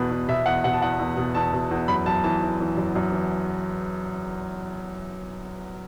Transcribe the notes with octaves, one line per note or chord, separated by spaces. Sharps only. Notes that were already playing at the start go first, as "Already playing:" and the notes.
Already playing: E2 B2 B4
E2
B2 E5
E2 F#5
B2 F#5
A5
E2 F#5
E2
B2
E2 A5
B2
E2
F#2 B5
F#2 A5
E3 A5
E3
E3
F#2
F#2
E3